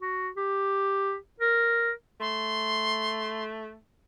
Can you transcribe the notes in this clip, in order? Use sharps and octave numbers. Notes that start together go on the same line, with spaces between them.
F#4
G4
A#4
A3 C6